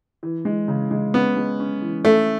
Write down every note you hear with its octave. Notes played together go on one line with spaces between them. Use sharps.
E3
G#3
C#3
G#3
B3 C#4
G#3
C#4
E3
A3 C#4